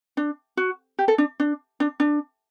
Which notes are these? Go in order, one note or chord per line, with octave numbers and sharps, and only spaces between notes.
D4
F#4
G4
A4
D4
D4
D4
D4